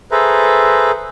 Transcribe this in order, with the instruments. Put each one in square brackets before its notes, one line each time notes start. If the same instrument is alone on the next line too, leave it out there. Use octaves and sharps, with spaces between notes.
[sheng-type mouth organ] G#4 A4 B4 C5 E5 A#5